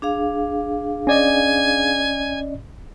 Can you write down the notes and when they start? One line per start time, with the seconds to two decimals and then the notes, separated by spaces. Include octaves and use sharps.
0.02 D4 G#4 F5
1.07 C#4 D5 D#5 G#5